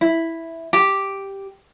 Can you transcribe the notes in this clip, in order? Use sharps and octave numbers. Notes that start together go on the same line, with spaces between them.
E4
G4